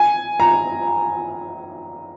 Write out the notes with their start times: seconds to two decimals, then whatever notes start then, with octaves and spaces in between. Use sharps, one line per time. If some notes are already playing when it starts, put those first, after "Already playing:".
Already playing: G#5
0.40 A#5